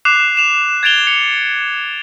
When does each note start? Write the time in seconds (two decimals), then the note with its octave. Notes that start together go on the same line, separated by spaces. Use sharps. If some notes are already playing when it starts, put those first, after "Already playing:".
0.05 D6 F#6 C7 E7 F7
0.37 E7 F7
0.83 G#6 A6 D7 F7 G7
1.07 C#7 F7